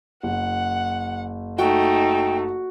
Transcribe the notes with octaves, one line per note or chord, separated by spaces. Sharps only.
F#1 F#5
A3 D#4 F#4 G5